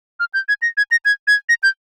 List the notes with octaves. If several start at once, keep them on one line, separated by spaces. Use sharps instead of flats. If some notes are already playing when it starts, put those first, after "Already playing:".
F6
G6
G#6
A#6
G#6
A#6
G#6
G#6
A#6
G6